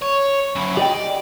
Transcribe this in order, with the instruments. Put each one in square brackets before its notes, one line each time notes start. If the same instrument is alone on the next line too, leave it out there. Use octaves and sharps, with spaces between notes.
[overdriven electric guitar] C#5
F#2 E4
[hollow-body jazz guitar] G4 D#5 G5 [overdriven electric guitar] D5